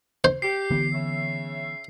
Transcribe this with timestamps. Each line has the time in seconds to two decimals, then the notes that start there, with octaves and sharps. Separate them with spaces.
0.24 C5
0.42 G4 C7
0.71 D3 E3 B3
0.92 C#3 C#5 E5